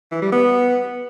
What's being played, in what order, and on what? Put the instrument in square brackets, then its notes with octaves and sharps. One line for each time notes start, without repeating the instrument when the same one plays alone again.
[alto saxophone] E3
G3
B3